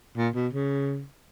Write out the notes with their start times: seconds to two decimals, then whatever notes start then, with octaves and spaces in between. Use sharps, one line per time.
0.17 A#2
0.35 B2
0.53 C#3